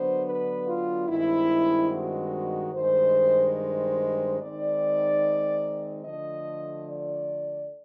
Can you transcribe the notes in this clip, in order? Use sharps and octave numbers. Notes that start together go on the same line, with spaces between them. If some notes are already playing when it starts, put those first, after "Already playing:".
Already playing: D3 F#3 B3 D4 C5
B4
F4
G2 D#3 G#3 C4 E4
F#4
G2 D#3 G#3 C5
C5
D#3 G#3 C4 D#4 D5
D3 F3 A3 D#5
D5